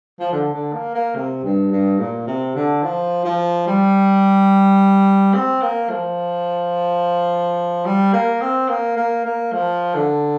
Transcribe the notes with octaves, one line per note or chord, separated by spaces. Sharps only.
F3
D3
D3
A#3
A#3
C3
G2
G2
A#2
C3
D3
F3
F3
G3
C4
A#3
F3
G3
A#3
C4
A#3
A#3
A#3
F3
D3